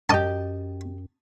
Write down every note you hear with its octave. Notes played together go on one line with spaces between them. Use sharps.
F#2 G4 D#5 G5 A5 D#6